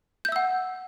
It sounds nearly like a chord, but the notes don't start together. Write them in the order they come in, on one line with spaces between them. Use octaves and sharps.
G6 E5 E6 F#5